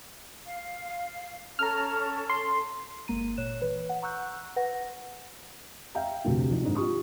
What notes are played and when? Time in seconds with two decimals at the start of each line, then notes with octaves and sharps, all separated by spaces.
0.46 F5
1.59 C#4 A4 A5 A#5 F6
2.30 C6
3.08 G1 G#3 A#3 A#5 D#7
3.37 A#2 C#5 F#6 E7
3.62 E3 B4
3.89 F#5
4.02 F#5 A#5 C#6 E6 F#6 G6
4.56 B4 F#5 A#6
5.95 E5 F5 G5 A#5
6.25 F1 D2 C3
6.49 F2 D#4
6.62 G#2 D3
6.75 F4 G4 C#6 D#6